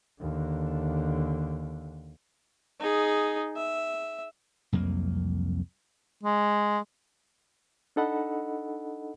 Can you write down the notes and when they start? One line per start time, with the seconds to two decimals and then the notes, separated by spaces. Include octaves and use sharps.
0.20 D#2 D3
2.80 D#4 G#4
3.57 E5
4.73 C2 F2 F#3 A#3
6.23 G#3
7.96 D4 D#4 A4 D#5 F#5 B5